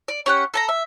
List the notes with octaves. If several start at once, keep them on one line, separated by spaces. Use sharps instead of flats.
D5
C#4 G4 F#5
A4 A5 A#5
E5